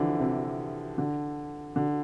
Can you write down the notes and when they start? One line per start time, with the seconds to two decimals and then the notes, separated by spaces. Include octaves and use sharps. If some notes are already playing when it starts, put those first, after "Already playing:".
Already playing: D3 E3 F3
0.20 C3
0.98 D3
1.76 D3